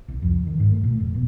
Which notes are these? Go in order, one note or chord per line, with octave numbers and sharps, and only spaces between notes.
C2
F2
D#3
G#2
A3
A#2
F1
B2